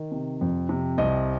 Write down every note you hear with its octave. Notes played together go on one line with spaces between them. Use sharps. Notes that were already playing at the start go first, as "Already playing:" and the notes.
Already playing: D#3
C3
F2
C3
C2 D#5